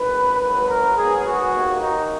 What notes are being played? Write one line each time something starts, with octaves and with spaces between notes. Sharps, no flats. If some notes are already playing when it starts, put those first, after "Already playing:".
Already playing: G#1 F#2 D#3 B4
G#1 G#2 F#3 B4
A#4
G#2 F#3 B3 G#4
F#4
D#2 D#3 A#3
D#4